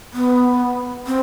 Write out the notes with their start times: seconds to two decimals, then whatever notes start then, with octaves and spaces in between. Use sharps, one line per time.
0.13 B3
1.07 C4